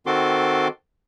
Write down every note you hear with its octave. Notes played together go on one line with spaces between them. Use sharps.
D#3 C4 F#4 A4 C6 D6